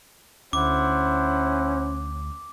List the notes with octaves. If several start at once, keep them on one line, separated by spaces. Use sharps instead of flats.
D2 C#4 E4 C5 F#5 D6